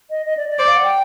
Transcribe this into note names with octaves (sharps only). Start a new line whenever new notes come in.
D#5
D#5
D5
D5
C5 D5
F5
F#5
G5